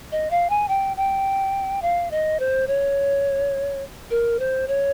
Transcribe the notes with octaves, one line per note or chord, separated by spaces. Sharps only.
D#5
F5
G#5
G5
G5
F5
D#5
C5
C#5
A#4
C5
C#5